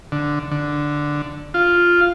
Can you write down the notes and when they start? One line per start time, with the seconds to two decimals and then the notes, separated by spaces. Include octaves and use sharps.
0.12 D3
0.52 D3
1.54 F4